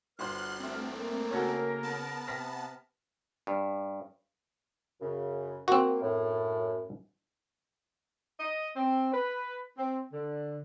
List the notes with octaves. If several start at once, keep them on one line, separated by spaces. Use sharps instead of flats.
G1 F#4 B4 C5 C6 F6 F#6
E2 A3 C4
A#3
C#3 C#4 F#4 A4 A#4
B3 A5
C3 F6 A#6 B6
G2
F#2 C#3
A#3 C4 F#4
F#2 A2
D#5
C4
B4
C4
D3